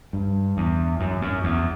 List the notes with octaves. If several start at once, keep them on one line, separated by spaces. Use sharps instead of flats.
G2
E2
F#2
F#2
E2